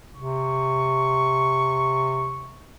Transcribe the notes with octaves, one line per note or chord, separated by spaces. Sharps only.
C3 C#6